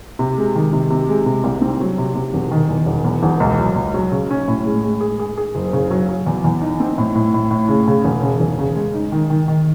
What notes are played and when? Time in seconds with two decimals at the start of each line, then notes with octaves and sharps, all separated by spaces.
0.19 C3
0.38 G#3
0.55 D#3
0.73 C3
0.90 C3
1.09 G#3
1.26 C3
1.44 C2
1.61 C4
1.80 F#3
1.98 C3
2.16 C3
2.33 E1
2.51 D#3
2.69 E2
2.86 E1
3.04 E2
3.23 E1
3.40 C#2
3.58 F#3
3.76 C#2
3.94 F#3
4.12 C#3
4.30 C#4
4.48 A2
4.66 G#3
4.83 G#3
5.01 G#4
5.19 G#4
5.38 G#4
5.55 F#1
5.73 C#3
5.90 F#3
6.08 F#3
6.26 E2
6.44 E2
6.61 D#4
6.80 C4
6.98 A2
7.15 A2
7.34 A2
7.51 A2
7.69 C#3
7.87 C#3
8.04 E1
8.23 C#3
8.40 E1
8.59 C#3
8.76 G#3
8.94 D#4
9.12 D#3
9.30 D#3
9.48 D#3